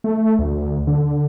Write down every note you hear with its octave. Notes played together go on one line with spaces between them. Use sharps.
A3
D2
D3